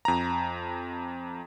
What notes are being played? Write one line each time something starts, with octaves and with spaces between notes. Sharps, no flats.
F2 A#5